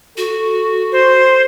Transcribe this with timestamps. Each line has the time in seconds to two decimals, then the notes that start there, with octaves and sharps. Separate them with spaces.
0.17 F#4 A4
0.92 C5